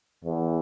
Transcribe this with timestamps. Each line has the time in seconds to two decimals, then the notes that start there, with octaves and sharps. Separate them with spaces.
0.24 E2